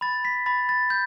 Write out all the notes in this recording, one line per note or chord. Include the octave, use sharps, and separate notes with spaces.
B5 A6
B6
B5 A6
A6
G6